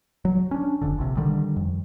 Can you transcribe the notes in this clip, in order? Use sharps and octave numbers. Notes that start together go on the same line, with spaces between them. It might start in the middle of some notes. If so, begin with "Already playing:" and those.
F#3
C#4 D4
F1 F2 D3
A#1 C3
D3 D#3 G3
F2